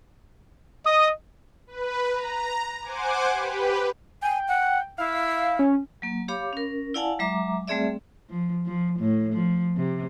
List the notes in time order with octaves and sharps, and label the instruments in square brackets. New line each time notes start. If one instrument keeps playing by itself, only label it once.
[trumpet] D#5 [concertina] D#6
[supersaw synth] B4
A#5
C5 F#5 G#5 D6
G4 B4
[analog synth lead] G5 [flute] G#5
[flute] F#5
[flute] E4 [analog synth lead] F5
[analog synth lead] C#4
[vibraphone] F#3 A#3
G4 C#5 F5 B5 D6
C#4 A#4
E4 D5 F5 F#5 G#5 A5
F#3 G#3 E5 A#5 D6
G3 A3 C4 G#4 D5 E5
[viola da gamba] F3
F3
A2
F3
C3